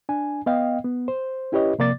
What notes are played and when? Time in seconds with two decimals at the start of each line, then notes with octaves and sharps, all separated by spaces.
0.09 D4 G#5
0.46 B3 D#5 F5 G5
0.84 B3
1.08 C5
1.52 C#4 E4 G4 B4 C#5 D#5
1.79 C3 F3 A#3 D5 D6 A6